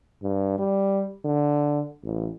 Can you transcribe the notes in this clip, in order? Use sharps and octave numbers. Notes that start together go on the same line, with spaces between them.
G2
G3
D3
A1